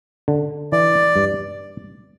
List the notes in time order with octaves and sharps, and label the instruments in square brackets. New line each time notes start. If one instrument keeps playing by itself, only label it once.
[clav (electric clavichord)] D3
[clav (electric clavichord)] E3 [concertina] D5
[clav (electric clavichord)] G2